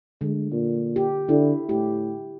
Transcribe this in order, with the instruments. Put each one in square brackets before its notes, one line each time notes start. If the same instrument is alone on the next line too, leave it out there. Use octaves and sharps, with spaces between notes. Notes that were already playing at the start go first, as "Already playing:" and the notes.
[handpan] D3 [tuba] G#3
[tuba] A#2
[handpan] G4
[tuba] D3 [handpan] E4
[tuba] A2 [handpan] G4